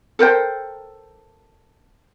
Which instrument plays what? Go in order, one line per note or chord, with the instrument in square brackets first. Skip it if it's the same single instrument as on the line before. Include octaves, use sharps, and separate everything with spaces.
[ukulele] A4 A#4 C5 G5